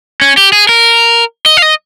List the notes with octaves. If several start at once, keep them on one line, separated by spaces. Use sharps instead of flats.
C#4
G4
G#4
A#4
D#5
F5
D#5